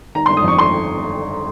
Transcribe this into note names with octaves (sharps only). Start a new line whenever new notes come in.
D#3 A#5
C6
G1
D#6
F2 C#6
C6